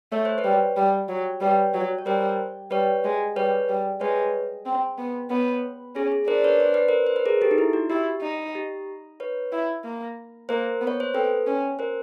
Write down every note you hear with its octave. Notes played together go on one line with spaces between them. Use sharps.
A3 C#5
C5
B4 C#5
G3
G3
F#3
G3 B4 C#5
F#3
C#5
G3 A#4 C5
G3 B4 C#5
G#3
G3 B4 C#5
G3
G#3 B4 C#5
C4
B3
B3 B4 C#5
C#4 G#4
G#4
D4 A#4 C5
B4 C#5
C5
B4
A#4 C5
C5
B4
G#4 A#4
G4 A4
D#4
E4
F#4
E4 G4
D#4
G4
B4 C#5
E4
A#3
A#3 A#4 C5
B3
C#5
C5
C4 A4 B4
C#4
A#4 C5